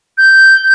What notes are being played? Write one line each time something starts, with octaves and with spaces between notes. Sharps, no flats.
G6